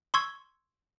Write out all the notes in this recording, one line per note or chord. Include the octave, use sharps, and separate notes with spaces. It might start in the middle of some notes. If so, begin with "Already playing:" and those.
C6 C#6 E6 G#6